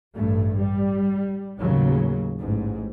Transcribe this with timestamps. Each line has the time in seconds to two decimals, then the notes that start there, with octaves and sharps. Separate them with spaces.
0.15 A1 G2 A3
0.57 G3
1.59 A1 D#2 C#3 F#3
2.40 A1 G#2